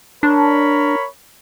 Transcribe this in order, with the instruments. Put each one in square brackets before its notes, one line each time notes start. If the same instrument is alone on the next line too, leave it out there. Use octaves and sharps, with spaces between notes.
[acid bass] D4 [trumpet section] A#4 C#5 B5